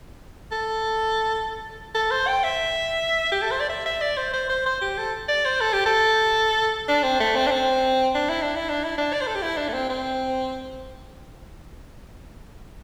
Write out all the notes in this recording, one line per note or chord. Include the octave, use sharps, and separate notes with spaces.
A4
A4
C5
G5
E5
G4
A4
C5
D5
E5
E5
D5
C5
C5
C5
C5
G4
A4
D5
C5
A4
G4
A4
D4
C4
A3
C4
D4
C4
D4
E4
D4
E4
D4
E4
D4
D5
C5
A4
G4
E4
D4
A3
C4
C4